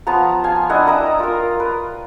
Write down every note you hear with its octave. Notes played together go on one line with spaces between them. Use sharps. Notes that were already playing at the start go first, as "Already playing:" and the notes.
F3 B3 A5 A#5
F5 G#5
D4 E4 D#5 F#5
G5 A#5 D#6 E6
F4 A#4
B4